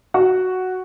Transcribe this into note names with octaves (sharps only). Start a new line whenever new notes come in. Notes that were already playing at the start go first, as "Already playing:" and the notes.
F#4 F#5